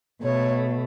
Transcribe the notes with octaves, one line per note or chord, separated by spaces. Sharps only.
B2 A3 C#5